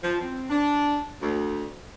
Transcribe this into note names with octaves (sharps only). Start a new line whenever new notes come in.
F3
C4
D4
D2